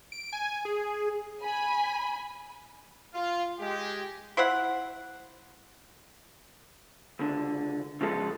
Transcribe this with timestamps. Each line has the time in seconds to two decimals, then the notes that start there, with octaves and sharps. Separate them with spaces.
0.12 D7
0.33 G#5
0.65 G#4
1.42 G#5 B5
3.14 F4
3.60 G#3 G4
4.37 E4 C5 E5 F#5
7.19 C#2 D3
8.01 C#3 F3 G#3 A4